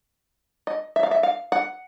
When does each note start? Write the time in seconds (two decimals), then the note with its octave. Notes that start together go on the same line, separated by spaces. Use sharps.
0.67 D#5
0.96 E5
1.03 F5
1.11 E5
1.23 F5
1.52 F#5